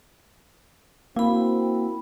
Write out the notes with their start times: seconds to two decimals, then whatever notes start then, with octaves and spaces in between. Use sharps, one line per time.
1.16 A#3 C4 E4 F#4 B5